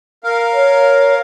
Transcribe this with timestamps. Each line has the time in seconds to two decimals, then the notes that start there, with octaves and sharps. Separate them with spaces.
0.24 A#4 F5
0.52 C#5